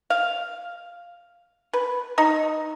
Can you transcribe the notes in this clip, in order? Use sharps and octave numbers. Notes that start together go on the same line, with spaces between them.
F5
B4
D#4